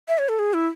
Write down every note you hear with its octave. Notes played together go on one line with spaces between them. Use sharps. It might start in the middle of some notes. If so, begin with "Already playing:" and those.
E5
C#5
A4
G#4
E4